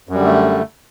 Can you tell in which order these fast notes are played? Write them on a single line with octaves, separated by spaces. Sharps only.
F#2 G3 D3 A3